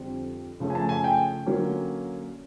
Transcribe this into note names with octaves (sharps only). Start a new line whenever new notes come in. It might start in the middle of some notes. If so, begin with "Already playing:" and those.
Already playing: F2 D3 G3 C4
C#3 F3 A3 C#4
G#5
A5
G#5
G5
D3 F#3 A#3 C#4